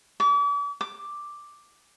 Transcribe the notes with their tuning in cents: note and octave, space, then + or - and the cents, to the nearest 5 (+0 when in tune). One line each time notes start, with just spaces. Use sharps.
D6 -40
D6 +5